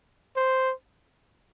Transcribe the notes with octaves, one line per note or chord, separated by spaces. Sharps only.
C5